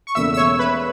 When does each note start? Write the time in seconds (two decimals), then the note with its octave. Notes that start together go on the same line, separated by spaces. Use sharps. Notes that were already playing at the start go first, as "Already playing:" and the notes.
0.07 C#6
0.15 E1 E2 C#3 A3 E5 E6
0.34 E6
0.37 C#5 C#6
0.59 B4 B5